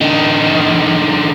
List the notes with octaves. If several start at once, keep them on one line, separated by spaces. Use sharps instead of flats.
D3 D#4